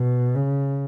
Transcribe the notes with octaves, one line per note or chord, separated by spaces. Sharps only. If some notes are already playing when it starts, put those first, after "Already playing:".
Already playing: B2
C#3